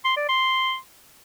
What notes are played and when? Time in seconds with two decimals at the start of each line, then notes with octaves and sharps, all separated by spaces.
0.05 C6
0.17 D5
0.29 C6